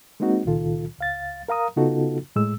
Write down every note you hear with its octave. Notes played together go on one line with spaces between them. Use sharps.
G#3 A#3 C4 D#4 F#4
C#2 A#2 D#3 F4 A4
C#2 F5 A6
A#4 F5 A#5 D#6
C#3 B3 D#4 F4 F#4 A4
A2 G#3 E6